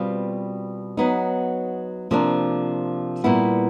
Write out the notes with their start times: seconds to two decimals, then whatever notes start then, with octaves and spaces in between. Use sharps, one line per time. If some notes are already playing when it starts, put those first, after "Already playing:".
Already playing: B2 G3 C4 F4
0.97 F#3 B3 D#4
2.11 C3 F3 A#3 D4
3.24 A#2 G3 B3 E4